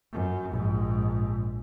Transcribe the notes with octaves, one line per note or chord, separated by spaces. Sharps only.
F#2
A#1 G#2